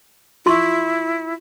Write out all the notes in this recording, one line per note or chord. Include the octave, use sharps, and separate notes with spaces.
E4 F4 C6 C#6